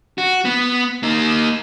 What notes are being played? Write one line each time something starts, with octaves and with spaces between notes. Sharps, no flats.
F#4
B3
A#3 D#4